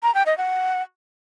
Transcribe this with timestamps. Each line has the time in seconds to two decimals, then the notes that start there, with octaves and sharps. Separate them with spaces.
0.03 A#5
0.15 G5
0.26 D#5
0.38 F#5